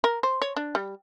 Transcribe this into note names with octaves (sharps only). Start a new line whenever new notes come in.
A#4
C5
C#5
D4
G3